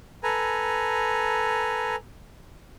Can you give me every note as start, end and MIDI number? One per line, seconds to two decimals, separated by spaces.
0.23 1.96 69
0.23 1.96 71
0.23 1.96 80
0.23 1.96 82